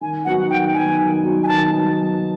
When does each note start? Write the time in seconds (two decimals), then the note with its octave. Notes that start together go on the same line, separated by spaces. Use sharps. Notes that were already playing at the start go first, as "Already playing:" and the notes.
0.01 D#3 G#5
0.25 F#3 B3 D#4 F#4 F#5
0.50 D#3 G5
0.74 F#3 B3 D#4 F#4 G#5
0.99 D#3
1.23 F#3 B3 D#4 F#4
1.43 G#5
1.47 D#3 A5
1.71 F#3 B3 D#4 F#4